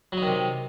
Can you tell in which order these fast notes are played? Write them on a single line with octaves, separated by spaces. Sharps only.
F#3 D#4 D#3 C3